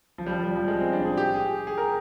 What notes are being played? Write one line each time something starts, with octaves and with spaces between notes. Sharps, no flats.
F3
G3
F3
G3
F3
G#3
C4
D4
G#4
G4
G#4
G#4
A#4